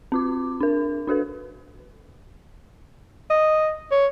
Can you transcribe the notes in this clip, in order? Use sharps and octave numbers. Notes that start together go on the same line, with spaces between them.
C4 F4 D6
D4 A#4
D4 F#4 A4 B4
D#5
C#5